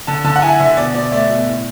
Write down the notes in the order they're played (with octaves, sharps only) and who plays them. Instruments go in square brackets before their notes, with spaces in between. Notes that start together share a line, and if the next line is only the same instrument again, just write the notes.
[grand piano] D3 A5
D3 A5
F#5
E4 G#5
D3 E5
B2 D5
B2 D5
A3 D5
B2
A2